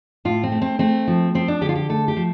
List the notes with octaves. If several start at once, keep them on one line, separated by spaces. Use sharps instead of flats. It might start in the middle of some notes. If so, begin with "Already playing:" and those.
A2 F4
C4
A3
C4
A3 C4
F3
F3 C4
D4
D3 G4
F4
G4
A3 A4
G4
F3